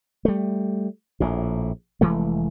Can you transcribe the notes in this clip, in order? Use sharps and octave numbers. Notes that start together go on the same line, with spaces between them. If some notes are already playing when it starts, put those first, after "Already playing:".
G3 A3
A#1 A2
F1 E3 G#3 A3